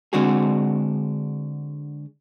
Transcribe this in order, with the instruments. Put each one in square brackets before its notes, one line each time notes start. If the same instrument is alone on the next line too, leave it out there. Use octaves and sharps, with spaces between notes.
[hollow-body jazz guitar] D3 G#3 C4 D4 F#4 G#4